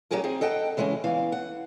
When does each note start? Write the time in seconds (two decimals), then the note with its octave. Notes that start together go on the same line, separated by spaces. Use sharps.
0.11 F#3 C#4 D#4 G4 G#4 A#4
0.24 C4 D#4 G#4
0.41 A4 D#5 F#5 G5
0.77 C#3 E3 G#3 C4 C#4
1.04 E2 E3 F5
1.32 F#5